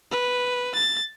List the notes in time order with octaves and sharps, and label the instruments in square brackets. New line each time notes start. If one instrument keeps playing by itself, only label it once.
[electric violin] B4
A6